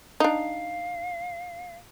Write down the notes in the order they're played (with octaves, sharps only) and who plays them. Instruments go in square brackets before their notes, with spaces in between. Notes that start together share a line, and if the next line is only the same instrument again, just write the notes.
[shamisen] D4 D#4 [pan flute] F5